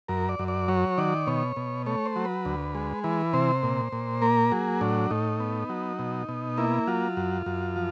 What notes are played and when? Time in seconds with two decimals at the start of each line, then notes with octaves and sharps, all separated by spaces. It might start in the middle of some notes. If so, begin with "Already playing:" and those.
0.08 F#2 A#4
0.29 D5
0.39 F#2
0.48 D5
0.68 F#3 C#5
0.98 D#3 D5
1.27 B2 C#5
1.56 B2
1.86 A3 C#5
2.05 C5
2.16 F#3
2.25 B4
2.45 D2
2.75 G#3
3.04 E3 B4
3.33 C3 C5
3.63 A#2
3.92 A#2
4.22 A#3 A#4
4.52 F#3 G#4
4.81 A2 D4
5.10 A2 D#4
5.40 B3
5.69 F#3
5.99 B2
6.29 B2
6.58 A#3 E4
6.87 F#3 F4
7.17 F#2
7.46 F#2
7.76 F3